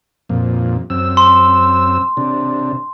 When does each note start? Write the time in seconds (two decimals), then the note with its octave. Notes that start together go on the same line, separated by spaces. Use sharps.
0.29 F2 A#2
0.90 F#2 C4 E6
1.17 C6
2.17 C3 D4